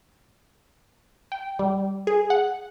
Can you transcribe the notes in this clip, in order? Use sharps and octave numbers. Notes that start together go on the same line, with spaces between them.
G5
G3
G#4
F#5